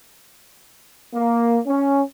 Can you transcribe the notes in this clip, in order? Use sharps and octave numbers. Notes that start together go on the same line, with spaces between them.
A#3
C#4